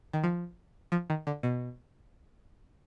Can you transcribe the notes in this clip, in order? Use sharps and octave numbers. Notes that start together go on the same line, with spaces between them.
D#3
F3
F3
D#3
D3
B2